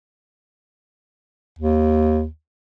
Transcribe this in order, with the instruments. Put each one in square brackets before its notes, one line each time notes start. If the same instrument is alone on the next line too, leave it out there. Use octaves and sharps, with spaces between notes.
[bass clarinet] D#2